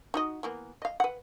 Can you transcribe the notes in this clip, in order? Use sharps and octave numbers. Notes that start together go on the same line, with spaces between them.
D#4 F#4 D#5
E3 A#3 B3
D#5 F5
B4 F#5